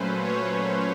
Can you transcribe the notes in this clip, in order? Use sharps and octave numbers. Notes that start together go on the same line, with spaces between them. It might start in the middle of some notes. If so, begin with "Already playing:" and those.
Already playing: A#2 F#3 A3 C#4 B4 C5
C#5